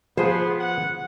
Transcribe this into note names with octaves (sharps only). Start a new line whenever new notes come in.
F3 B3 G#4 C5
F#5